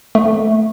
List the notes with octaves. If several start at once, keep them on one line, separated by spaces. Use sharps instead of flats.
A3